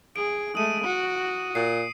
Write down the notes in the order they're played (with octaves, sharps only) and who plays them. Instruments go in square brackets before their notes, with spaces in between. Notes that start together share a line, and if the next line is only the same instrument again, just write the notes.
[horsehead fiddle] G#4 [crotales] D7
[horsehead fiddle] G#3 A3 [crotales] D#6 D#7
[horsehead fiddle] F#4
[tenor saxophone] A#2 [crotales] C7